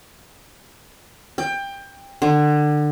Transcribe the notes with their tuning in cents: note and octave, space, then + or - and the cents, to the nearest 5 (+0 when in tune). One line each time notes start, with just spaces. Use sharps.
G5 +20
D3 +25